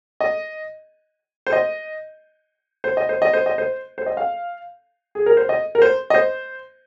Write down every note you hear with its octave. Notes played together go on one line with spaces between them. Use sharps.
D#5
C5
D#5
C5
D#5
C5
D#5
C5
D#5
C5
C5
D#5
F5
G#4
A#4
C5
D#5
A#4
C5
D#5
C5